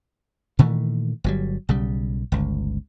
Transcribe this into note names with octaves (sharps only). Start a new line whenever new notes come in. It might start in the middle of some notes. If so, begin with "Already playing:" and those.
A#2 D#3 E3 A3
G1 F#3 G3
B1 C#3 G3
G1 C#2